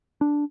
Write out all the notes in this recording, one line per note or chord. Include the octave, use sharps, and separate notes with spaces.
D4